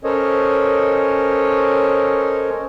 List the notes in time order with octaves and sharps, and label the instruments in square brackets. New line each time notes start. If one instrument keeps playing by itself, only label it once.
[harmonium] C#4 A4 A#4 C5 C#5 D#5